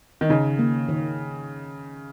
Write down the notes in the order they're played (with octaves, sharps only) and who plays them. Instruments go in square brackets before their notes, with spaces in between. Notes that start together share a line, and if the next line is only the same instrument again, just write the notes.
[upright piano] D#3
[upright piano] C#3 [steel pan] D#4
[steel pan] A#3
D#3